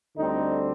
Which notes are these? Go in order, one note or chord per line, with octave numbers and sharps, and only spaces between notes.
D2 D3 G3 C4 D#4